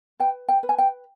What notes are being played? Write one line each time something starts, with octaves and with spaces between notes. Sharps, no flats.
B4 G5
G5
B4
G#5
G5